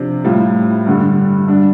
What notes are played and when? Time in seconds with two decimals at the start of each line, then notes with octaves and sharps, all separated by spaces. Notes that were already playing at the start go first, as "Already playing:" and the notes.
Already playing: C3 F3 D4
0.24 A2 G3 F4
0.86 G2 D3 G3
1.48 G2 G3 D4